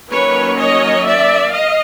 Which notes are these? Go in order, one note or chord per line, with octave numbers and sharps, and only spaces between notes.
D#3 F#3 A#3 C#4 B4 C#5
C#5 D#5
D5 E5
D#5 F5